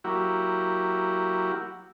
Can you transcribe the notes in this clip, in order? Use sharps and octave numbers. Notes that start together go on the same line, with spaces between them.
F#3 A#3 E4 F#4 G4